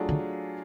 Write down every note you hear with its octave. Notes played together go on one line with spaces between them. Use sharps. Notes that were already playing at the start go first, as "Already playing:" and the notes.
Already playing: F#3 A3 D4 F4 G#4
D3